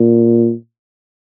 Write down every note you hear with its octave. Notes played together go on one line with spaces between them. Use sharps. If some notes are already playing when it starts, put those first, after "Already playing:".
Already playing: A#2